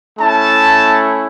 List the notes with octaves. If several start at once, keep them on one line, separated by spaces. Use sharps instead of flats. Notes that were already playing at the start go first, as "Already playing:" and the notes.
A3 C#4 E4 A5